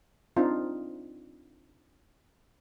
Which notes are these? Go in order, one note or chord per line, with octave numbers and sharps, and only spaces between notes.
C4 D4 D#4 F4